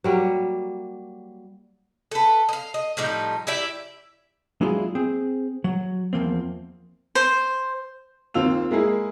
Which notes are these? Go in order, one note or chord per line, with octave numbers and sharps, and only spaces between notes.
F#3 G3 A#3
A4 B4
D#5 F5
D#5
A2 F3 G3 D#4
E4 G4 D5 E5
F#3 G#3 D4 E4 F4 G#4
C4 G#4
F#3
E2 F3 A#3 C4
C5
D#2 C4 F4 E6 F7
G#3 A#3 E4 G#4